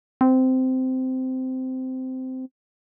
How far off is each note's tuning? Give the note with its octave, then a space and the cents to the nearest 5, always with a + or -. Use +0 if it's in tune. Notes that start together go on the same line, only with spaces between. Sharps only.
C4 -15